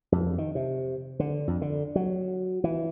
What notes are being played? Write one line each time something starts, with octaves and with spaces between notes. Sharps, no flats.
F2
D#3
C3
D3
F2
D3
F#3
E3